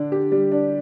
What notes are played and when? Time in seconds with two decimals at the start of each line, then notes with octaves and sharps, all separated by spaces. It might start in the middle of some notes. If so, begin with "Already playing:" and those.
Already playing: D3 D4
0.12 G4
0.32 G3
0.52 D4